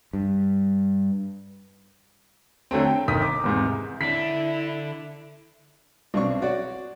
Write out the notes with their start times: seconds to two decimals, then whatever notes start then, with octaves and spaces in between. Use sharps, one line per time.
0.13 G2
2.71 D3 F#3 A3 C4
2.85 G5
3.08 G1 D#3 A#4 D#6 B6
3.22 D6
3.44 E2 G#2 C3
4.01 D3 D4 E4 B6
6.14 B1 C4 D4 C#6
6.42 F#4 C#5 D5